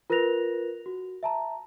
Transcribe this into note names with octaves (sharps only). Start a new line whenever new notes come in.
F4 A#4 B4 F#6 A#6 F7
F#4
E5 A5 A#5